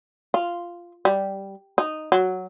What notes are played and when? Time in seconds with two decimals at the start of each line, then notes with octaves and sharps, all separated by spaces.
0.34 F4
1.05 G3
1.78 D#4
2.12 F#3